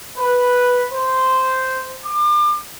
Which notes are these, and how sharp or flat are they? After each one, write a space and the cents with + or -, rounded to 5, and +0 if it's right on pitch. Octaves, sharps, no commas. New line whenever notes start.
B4 -5
C5 -10
D6 +35